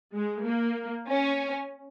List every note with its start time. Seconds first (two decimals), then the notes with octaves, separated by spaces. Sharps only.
0.14 G#3
0.45 A#3
1.07 C#4